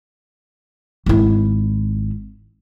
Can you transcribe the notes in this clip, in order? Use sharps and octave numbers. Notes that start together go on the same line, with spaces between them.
G#1 E4